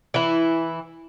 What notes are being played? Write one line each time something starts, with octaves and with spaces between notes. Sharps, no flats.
E3 E4